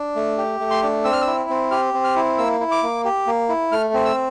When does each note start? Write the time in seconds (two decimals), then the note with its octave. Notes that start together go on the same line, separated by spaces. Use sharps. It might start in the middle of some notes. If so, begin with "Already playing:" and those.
Already playing: D4
0.16 A3
0.38 G4
0.60 A3
0.71 C6
0.83 D4
1.05 C4 E6
1.13 F6
1.21 E6
1.27 E4
1.50 C4
1.71 G4 F6
1.94 C4
2.04 F6
2.16 E4
2.38 A#3 E6
2.60 E4
2.72 D6
2.83 A#3
3.05 G4
3.27 A#3
3.49 E4
3.72 A3 F6
3.94 C4
4.05 E6